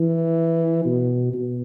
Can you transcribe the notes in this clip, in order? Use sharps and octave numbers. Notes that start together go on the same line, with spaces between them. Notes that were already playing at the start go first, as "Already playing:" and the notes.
Already playing: E3
B2
B2